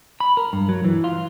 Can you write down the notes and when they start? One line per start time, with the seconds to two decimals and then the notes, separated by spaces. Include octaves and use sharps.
0.20 B5
0.37 A#4
0.53 G2
0.69 F#3
0.84 E3
1.04 F4